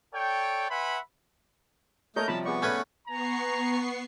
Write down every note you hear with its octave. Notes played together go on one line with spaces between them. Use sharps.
A4 C#5 D5 G5
B4 E5 F#5 G#5 B5 C6
A3 A#3 A#4 C#5 D#5 A#5 G6
C3 F3 G3 A5 B5
B3 G#4 D5 C#6
A3 C#4 B4 G#5
B3 G#5 A#5 C#6 C7